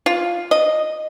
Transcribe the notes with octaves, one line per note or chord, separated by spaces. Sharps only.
F4
D#5